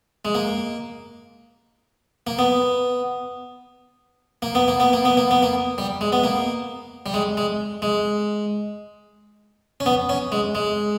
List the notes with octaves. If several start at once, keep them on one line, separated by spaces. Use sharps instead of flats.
G#3
A#3
A#3
B3
A#3
B3
A#3
B3
A#3
B3
A#3
B3
A#3
G3
G#3
B3
A#3
G3
G#3
G#3
G#3
C#4
B3
C#4
G#3
G#3